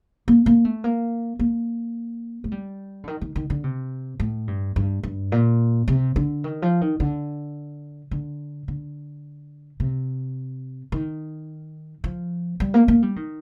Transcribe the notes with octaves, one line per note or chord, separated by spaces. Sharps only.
A#3
A#3
A3
A#3
A#3
A3
G3
D3
D#3
D#3
D#3
D3
C3
A2
G2
G2
G2
A#2
C3
D3
D#3
F3
D#3
D3
D3
D3
C3
D#3
F3
G3
A#3
A#3
G3
D#3